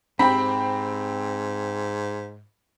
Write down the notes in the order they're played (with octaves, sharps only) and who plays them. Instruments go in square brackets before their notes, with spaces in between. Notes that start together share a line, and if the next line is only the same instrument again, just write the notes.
[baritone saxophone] G#2 [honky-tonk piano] C4 G4 [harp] B5